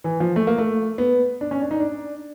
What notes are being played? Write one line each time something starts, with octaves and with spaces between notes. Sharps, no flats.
E3
F3
A3
A#3
A3
B3
D4
C#4
D4
D#4
D4